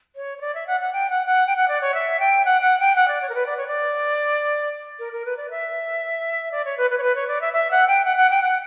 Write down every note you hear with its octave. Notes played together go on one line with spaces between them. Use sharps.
C#5
C#5
D5
E5
F#5
F#5
G5
F#5
F#5
G5
F#5
D5
C#5
E5
G5
F#5
F#5
G5
F#5
D5
C#5
A#4
B4
D5
C#5
D5
A#4
A#4
B4
D5
E5
D5
C#5
B4
B4
C#5
B4
C#5
D5
E5
E5
F#5
G5
F#5
F#5
G5
F#5